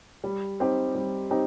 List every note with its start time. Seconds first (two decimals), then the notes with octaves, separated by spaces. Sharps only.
0.24 G3
0.60 C4 D#4 G4
0.95 G3
1.31 C4 D#4 G4